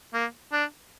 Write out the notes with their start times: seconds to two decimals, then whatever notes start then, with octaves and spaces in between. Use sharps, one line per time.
0.14 A#3
0.52 D4